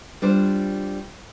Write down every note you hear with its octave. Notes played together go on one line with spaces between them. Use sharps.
G3 D4 F4 C5